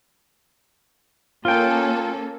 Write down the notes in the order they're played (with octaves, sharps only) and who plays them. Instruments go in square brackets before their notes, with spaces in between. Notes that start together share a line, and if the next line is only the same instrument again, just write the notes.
[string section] A#3 C#4 A4 [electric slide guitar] F4 G5